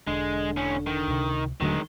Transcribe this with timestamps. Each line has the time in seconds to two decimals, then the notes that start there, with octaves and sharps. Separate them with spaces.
0.07 E1 D3 G#3
0.57 A2 C#4
0.87 D#3
1.07 C#2 C3
1.61 D#1 D2 D3 D#3 F#3 G#3